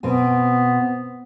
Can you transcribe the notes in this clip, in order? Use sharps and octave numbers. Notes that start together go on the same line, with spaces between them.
B2 B3 C4 G#5